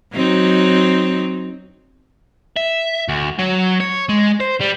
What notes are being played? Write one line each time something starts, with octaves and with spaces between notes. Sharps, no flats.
F#3 C4 D#4
E5
D2
F#3
C#5
G#3
C5
G3